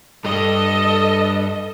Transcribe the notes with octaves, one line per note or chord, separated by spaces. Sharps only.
G2 A4 D#5